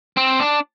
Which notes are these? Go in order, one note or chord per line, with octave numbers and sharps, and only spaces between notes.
C4
D4